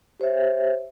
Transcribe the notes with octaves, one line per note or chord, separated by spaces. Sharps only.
G4 C5 C#5 E5